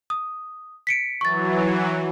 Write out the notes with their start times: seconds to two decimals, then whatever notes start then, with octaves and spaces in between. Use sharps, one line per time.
0.10 D#6
0.87 B6 C#7 D7
1.21 E3 F#3 C#6 A6